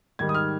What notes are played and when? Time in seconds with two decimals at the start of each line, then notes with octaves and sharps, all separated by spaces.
0.19 G#2 D#3 G3 G#6
0.29 D#6
0.35 F6